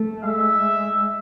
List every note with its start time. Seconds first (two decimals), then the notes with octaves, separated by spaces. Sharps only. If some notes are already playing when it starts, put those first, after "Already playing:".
Already playing: A3
0.23 G#3 E5